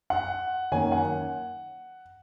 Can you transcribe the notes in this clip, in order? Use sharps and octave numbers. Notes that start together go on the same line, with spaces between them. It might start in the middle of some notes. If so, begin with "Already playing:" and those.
F#5
F#2 D#3 A#3 C#4 G#5
F#5